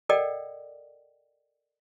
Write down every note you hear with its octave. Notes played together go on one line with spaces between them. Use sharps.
A4 A#4 D5 D#5 F#5 G5